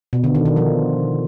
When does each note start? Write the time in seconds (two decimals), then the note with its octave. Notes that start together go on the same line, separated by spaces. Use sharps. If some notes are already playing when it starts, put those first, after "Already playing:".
0.13 B2
0.24 D3
0.35 D#3
0.46 D#3
0.56 F3